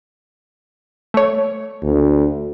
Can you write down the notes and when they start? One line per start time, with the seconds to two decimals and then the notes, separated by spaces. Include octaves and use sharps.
1.14 A3 C#5
1.83 D2